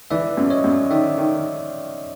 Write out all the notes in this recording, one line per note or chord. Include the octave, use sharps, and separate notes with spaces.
E3 D5 E5
F#2
C#5 D#5
F#2
D#3 D5 E5
D#3